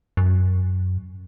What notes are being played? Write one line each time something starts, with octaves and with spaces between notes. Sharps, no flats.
F#2